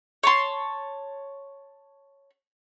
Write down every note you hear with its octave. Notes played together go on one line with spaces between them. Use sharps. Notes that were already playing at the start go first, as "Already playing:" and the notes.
C#5 A5 C6